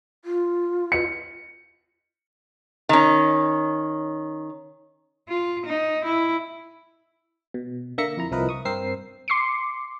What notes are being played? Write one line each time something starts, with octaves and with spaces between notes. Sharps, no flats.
F4
C#7
D#3 C#4
F4
D#4
E4
B2
D3 A#3 E5 A#6 C#7
F2 E4 A#5
C2 F3 E4 A#4 B4 D#5
C#6 D#6
G2 C4 A#4 C5 E6 C7
C6 D6 C7 C#7